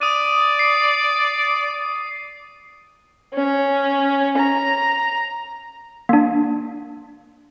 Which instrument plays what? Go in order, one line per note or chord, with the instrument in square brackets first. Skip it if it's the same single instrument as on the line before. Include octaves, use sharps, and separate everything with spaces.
[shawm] D5 [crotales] D#6 D#7
[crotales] C7
[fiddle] C#4
A#5
[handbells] A#3 D4